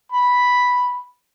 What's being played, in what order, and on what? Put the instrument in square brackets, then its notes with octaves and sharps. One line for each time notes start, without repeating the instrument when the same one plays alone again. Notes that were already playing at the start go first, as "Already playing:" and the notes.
[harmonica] B5